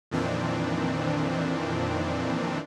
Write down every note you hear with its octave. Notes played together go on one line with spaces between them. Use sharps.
F2 A#2 D#3 E3 C4 D4